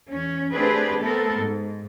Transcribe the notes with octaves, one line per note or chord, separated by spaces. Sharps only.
E2 C#4
A3 C4 D4 G4 G#4 B4
A3 B3 C4 A4 A#4
G#2